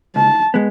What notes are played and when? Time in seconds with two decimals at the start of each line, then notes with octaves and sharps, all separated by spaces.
0.16 C#2 A5
0.54 G#3 B3